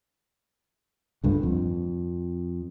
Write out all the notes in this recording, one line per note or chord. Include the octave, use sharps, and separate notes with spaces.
C#2 G2 D3
F2